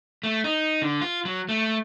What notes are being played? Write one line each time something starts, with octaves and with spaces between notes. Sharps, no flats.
A3
D#4
D3
F4
F#3
A3